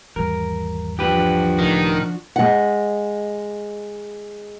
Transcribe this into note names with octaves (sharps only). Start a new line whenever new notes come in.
G#1 E2 G3 A#4
F3 D4 F#4 G4 B4
C#2 A2 D#3
G#3 F#5